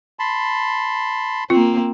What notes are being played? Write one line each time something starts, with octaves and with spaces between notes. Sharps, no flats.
A5 B5 C6
A#3 C4 F4